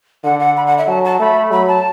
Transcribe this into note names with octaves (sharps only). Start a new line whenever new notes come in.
D3 F#5
F#5
B5
F#5
E5
F#3 A5
A5
A3 B5
F#3 B5
A5